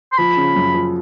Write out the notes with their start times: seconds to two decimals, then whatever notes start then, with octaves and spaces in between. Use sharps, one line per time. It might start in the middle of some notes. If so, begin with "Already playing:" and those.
0.12 C6
0.18 F3 B5
0.37 C#3
0.56 F#2
0.74 F3